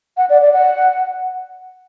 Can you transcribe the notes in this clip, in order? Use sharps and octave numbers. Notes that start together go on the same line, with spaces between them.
F#5
D5
D5
F#5